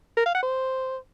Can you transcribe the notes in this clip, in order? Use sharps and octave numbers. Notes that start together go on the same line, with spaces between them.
A#4
F5
F#5
C5